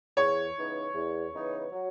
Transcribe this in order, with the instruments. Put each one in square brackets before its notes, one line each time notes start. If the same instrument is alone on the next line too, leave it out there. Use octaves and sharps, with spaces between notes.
[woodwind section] E2 [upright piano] C#5
[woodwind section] C#3 E3 B3 D#4
E2
C#3 E3 B3 D#4
F#3